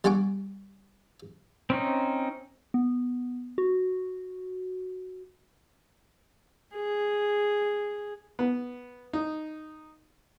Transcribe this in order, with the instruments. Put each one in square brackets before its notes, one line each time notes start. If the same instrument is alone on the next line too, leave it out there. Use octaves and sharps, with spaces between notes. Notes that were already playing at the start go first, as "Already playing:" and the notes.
[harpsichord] G3 F#5 G#5 C#6 D6
[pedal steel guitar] C4 C#4 D#4
[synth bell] B3
F#4
[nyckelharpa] G#4
[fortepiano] B3
D#4